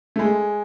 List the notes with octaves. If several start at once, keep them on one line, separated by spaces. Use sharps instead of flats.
A3
G#3